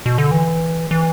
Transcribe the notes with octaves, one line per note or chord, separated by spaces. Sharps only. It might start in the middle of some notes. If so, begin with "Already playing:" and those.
B2
D3
E3
E3